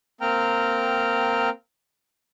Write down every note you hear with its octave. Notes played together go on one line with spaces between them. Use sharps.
A#3 C4 G5 A#5 F6